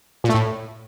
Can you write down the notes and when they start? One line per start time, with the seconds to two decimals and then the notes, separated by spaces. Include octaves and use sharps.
0.24 A#2
0.29 A3
0.34 A2